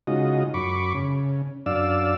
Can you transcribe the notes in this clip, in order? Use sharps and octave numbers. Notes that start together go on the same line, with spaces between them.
C#3 G#3 D#4 F4 F#4 D#5
F#2 B5 C#6 D6
C#3
F#2 D4 D5 F5 E6